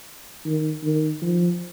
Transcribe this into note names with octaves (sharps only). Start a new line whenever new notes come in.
D#3
D#3
F3